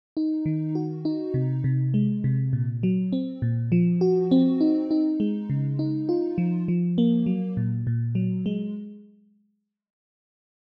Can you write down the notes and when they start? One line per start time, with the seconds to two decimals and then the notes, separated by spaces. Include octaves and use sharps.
0.17 D#4
0.46 D#3
0.75 F#4
1.05 D#4
1.34 C3
1.64 C3
1.94 G#3
2.24 C3
2.53 A#2
2.83 F#3
3.13 C4
3.42 A#2
3.72 F3
4.01 F#4
4.31 C4
4.61 D#4
4.91 D#4
5.20 G#3
5.50 C#3
5.79 D#4
6.09 F4
6.38 F3
6.68 F3
6.98 A#3
7.26 F#3
7.57 A#2
7.87 A#2
8.15 F#3
8.46 G#3